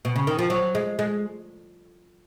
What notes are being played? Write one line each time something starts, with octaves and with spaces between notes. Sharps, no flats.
B2
C#3
D#3
F3
F#3
G#3
G#3